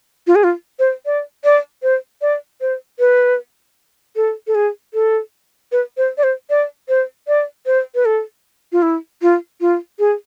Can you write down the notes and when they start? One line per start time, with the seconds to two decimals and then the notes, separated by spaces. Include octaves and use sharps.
0.27 F4
0.35 G#4
0.44 F4
0.79 C5
1.06 D5
1.44 D5
1.83 C5
2.22 D5
2.61 C5
2.99 B4
4.16 A4
4.47 A4
4.55 G#4
4.94 A4
5.72 B4
5.97 C5
6.18 D5
6.23 C5
6.50 D5
6.89 C5
7.28 D5
7.66 C5
7.95 B4
8.05 A4
8.72 F4
8.82 E4
9.22 F4
9.61 F4
9.99 G#4